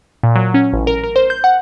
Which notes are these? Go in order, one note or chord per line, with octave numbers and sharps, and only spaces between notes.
A#2
F#3
C#4
A1
A#4
A#4
C5
G6
F#5